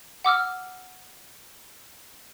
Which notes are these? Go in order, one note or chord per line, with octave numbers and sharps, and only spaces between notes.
F#5 D6 E6 F6